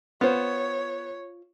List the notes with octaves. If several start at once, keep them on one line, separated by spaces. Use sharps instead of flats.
B3 F4 C5 C#5